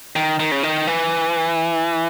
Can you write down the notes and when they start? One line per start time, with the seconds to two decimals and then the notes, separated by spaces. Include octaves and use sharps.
0.16 D#3
0.39 D#3
0.52 C#3
0.63 D#3
0.87 E3